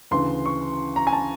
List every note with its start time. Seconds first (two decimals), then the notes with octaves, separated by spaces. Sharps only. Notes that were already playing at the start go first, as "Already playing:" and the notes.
0.11 D2 C#3 E3 C6
0.46 C#6
0.96 A#5
1.07 G#5
1.13 A5